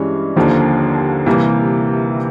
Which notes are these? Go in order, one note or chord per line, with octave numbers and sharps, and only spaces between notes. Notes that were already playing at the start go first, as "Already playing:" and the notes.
Already playing: G2 E3 G#3 C#4
D#2 D3 F3 A#3
C3 E3 G3 A#3